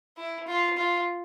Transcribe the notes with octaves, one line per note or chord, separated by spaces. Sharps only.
E4
F4
F4